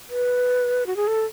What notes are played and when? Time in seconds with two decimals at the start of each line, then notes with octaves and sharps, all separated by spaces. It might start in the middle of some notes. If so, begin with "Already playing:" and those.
0.10 B4
0.86 F#4
0.96 G#4
1.07 A4